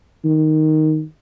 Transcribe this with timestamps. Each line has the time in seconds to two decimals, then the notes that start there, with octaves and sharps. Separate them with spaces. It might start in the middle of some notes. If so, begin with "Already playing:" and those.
0.24 D#3